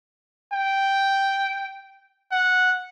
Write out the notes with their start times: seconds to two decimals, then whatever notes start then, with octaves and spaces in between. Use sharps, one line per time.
0.53 G5
2.32 F#5